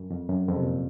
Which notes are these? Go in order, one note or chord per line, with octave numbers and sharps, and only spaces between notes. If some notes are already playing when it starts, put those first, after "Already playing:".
Already playing: F#2
F2
F#2
F2
C3
A#2